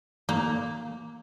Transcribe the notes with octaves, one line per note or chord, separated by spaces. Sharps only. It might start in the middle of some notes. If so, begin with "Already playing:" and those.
A#3